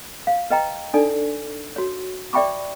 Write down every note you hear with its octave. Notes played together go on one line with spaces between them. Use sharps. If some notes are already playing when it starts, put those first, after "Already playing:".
F5
B4 D#5 G5 A#5
D4 D#4 A4 D5 G#5
F#4 C#5
D5 E5 G5 B5 C#6 D6